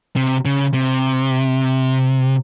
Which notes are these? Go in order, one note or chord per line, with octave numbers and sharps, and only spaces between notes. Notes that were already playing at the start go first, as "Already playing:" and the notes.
C3
C#3
C3